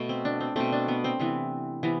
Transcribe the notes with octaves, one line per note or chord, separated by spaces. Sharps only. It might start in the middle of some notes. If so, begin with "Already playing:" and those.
Already playing: B2 A3
C4
D4
C4
B2 A3 C4
D4
B3
C4
C3 E3 B3
C3 E3 B3